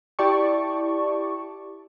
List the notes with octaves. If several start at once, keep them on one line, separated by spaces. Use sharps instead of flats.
E4 G4 D5 A5 C#6